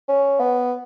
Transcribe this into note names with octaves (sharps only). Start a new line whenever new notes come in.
C#4
B3